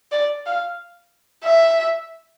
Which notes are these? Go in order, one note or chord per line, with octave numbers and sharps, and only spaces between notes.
D5
F5
E5